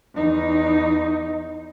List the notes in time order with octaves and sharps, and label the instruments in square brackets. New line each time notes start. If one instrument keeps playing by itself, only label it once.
[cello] E2 D#4